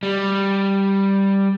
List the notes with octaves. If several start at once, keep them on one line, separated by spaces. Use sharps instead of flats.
G3